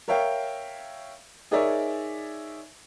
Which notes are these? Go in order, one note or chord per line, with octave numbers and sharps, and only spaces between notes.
A#4 C#5 E5 F5 G5
D#4 G#4 A#4 C#5 D5 E5